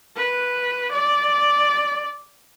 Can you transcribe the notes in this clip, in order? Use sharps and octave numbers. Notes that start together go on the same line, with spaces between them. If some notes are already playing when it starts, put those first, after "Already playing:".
B4
D5